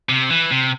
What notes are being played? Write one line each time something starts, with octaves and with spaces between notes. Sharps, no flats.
C3
E3
C3